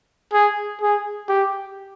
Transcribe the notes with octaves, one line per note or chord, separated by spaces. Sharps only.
G#4
G#4
G4